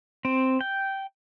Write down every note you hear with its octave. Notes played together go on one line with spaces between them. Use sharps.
C4
G5